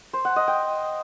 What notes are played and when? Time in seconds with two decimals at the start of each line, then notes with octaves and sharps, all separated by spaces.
0.13 C5
0.25 F#5
0.36 D#5
0.48 G5